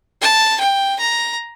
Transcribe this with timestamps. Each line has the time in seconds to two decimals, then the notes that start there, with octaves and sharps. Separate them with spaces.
0.22 A5
0.61 G5
1.00 A#5